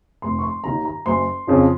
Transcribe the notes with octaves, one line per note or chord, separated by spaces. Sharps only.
F1 C6
C#6
C6
D#2 D#3 A#5
A#5
F#1 C6
F2 C#3 F3